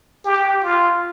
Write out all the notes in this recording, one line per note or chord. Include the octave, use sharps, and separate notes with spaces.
G4
F4